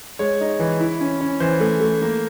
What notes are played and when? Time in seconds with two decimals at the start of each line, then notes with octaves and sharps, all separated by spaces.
0.19 G#3 C#5
0.41 D#4
0.60 E3
0.80 E4
1.01 C#4
1.21 C#4
1.40 E3 C5
1.60 A3
1.80 A3
2.02 A#3